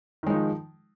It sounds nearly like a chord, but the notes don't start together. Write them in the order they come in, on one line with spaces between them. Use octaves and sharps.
D#3 G#3 D#4 F3